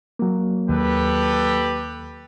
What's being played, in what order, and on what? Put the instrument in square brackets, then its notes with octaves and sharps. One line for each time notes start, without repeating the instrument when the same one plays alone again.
[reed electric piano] F#3 A#3
[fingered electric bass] D#2 [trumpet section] G4 A4 B4